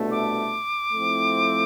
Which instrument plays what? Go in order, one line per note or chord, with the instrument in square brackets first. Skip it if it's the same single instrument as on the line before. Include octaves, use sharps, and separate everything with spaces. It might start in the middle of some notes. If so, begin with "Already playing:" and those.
Already playing: [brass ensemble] C2 B2 A3 D4
[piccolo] D6
[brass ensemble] F3 A3 C4 E4